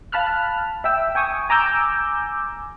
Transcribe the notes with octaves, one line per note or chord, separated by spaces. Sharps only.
F5 A5 B5 F6 F#6
E5 G5 E6
G5 G#5 C#6 D#6
G#5 A#5 D6 E6 G6